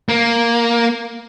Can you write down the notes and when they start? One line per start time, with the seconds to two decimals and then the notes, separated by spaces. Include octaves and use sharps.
0.09 A#3